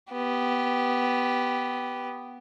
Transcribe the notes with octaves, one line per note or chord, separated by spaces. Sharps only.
B3 G4